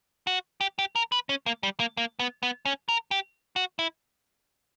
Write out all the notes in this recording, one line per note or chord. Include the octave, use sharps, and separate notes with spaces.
F#4
G4
G4
A#4
B4
C#4
A#3
G3
A#3
A#3
B3
B3
C#4
A#4
G4
F#4
E4